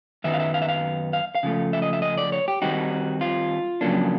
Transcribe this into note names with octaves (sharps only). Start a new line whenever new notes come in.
F#2 D#3 F#3 B3 D#4 E5
F5
E5
F5
E5
F5
F5
F5
C#3 F3 A3
E5
D#5
E5
D#5
D5
C#5
G4
D#3 G3 C4 D#4 F#4
F4
F2 C#3 F#3 A#3 D4